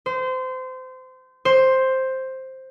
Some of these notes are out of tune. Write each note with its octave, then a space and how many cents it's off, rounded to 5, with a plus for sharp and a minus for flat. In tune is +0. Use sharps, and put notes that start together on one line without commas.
C5 -25
C5 +5